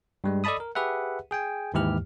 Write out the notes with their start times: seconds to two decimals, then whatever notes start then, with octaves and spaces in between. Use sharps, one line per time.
0.24 G2 G3 G#3
0.44 A4 D5 D#5 A5 B5 D#6
0.60 A#4
0.75 G4 G#4 B4 E5 F#5
1.31 G#4 G5 G#5
1.74 D#2 G#2 E3 E4 G4 F6